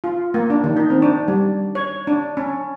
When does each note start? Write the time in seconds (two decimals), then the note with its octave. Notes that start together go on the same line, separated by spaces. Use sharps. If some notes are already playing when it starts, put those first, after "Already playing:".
0.04 F4
0.34 A#3
0.50 D4
0.64 D#3
0.76 D#4
0.90 C4
1.02 D4
1.28 G3
1.75 C#5
2.07 D4
2.37 C#4